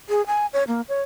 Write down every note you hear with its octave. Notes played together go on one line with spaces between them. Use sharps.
G#4
G#5
C#5
A#3
C#5